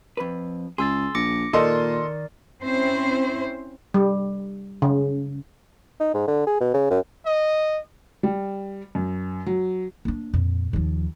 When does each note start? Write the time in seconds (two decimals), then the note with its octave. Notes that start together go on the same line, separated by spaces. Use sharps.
0.17 F2 B4
0.78 C#2 G#4 C6 E6 A6
1.15 A#1 D6 A#6 C#7
1.53 A#2 D#3 A4 A#4 D5 D#5 C6
2.62 C4 C#4 E4 C5
3.94 G3
4.82 C#3
6.00 D#4
6.14 G#2
6.28 D3
6.47 G#4
6.61 B2
6.74 C#3
6.91 F#2
7.26 D#5
8.23 G3
8.95 F#2
9.46 F#3
10.05 A#3 D4
10.34 F2 A#2
10.73 D#2 F3